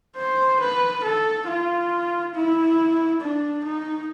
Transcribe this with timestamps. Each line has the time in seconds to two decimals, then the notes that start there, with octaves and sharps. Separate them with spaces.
0.17 C5
0.60 B4
1.04 A4
1.47 F4
2.34 E4
3.21 D4
3.64 D#4